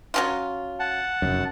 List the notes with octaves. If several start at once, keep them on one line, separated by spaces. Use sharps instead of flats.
F#3 C#4 F4
F#5 A5
F1 F#2